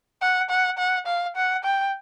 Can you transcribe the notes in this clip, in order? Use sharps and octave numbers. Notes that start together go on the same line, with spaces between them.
F#5
F#5
F#5
F5
F#5
G5